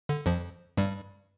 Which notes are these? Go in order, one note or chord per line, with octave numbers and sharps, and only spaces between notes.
D3
F2 F3
G2 G3